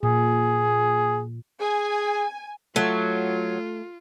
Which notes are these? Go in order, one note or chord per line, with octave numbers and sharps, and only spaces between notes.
A#2 G#4
G#4 G#5
F#3 A3 F4